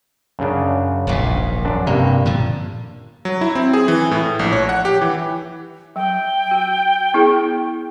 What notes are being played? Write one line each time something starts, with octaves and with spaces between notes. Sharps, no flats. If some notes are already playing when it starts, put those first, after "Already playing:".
F#2 C#3 D4
D#1 A#1 G#2
F#2 D4
G2 C3 A#3
A#2 D3 F3
F#3
E4
C4
G#4
E3
A2
A#1
C#5
F#5
G4
E3
F#3 G5
F#4
B3 E4 G#4